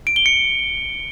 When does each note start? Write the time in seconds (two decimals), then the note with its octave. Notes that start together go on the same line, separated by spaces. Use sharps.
0.07 D7
0.16 G7
0.26 C#7